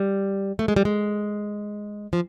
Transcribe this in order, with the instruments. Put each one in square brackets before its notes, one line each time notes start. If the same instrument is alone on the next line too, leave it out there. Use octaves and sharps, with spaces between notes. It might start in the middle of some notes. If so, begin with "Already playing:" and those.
Already playing: [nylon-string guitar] G3
A3
G#3
G3
G#3
F3